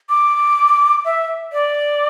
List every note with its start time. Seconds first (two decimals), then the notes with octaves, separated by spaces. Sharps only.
0.10 D6
1.05 E5
1.52 D5